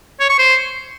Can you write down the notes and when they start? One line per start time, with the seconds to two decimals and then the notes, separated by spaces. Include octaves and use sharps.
0.20 C#5
0.29 C#6
0.39 C5